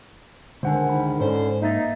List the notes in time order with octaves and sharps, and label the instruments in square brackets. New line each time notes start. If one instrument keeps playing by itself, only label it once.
[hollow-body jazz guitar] C#2 D3 [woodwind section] G#2 D#3 [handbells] C5 F#5 G#5
[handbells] D#4 B5
[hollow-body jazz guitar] G#2 [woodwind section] D3 C#4 C5
[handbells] A#3 E5 A6 [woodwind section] D#4